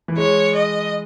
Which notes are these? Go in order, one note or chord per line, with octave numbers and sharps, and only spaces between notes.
E3
G#3 C#5
D#5